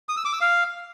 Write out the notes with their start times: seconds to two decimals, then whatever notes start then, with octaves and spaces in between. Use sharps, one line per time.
0.09 D#6
0.17 E6
0.25 D6
0.33 E6
0.41 F5